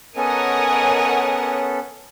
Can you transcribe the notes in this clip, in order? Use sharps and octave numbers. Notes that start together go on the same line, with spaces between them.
B3 C#4 A4 A#4 C#5 D#5 F#5 G#5